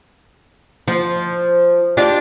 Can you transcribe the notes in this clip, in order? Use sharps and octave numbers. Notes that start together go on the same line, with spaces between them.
F3
D4 F4 G4